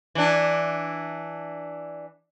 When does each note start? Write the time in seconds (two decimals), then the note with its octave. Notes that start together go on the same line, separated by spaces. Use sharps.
0.15 E3 D4